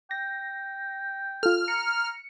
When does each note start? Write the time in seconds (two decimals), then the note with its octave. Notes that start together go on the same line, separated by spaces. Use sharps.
0.11 G5 A#6
1.43 F4 A4 F6
1.68 A#5 C#7